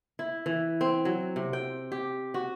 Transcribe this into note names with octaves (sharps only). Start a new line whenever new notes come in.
E4
E3
C4
F#3
C3
G5
G4
F#4